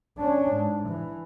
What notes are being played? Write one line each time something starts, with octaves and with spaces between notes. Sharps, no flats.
C#4 D4
G#2
E3